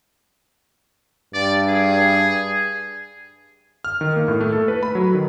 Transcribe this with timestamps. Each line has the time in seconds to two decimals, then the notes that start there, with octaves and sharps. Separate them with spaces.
1.34 G2 D5
1.69 G#4
3.85 F6
4.01 D#3
4.16 A#3
4.28 A2
4.41 A3
4.52 A4
4.68 B4
4.83 B5
4.95 F#3
5.14 D#3